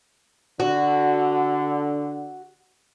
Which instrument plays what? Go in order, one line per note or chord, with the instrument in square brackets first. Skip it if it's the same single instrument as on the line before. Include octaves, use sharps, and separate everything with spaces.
[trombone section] D3 [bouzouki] F#4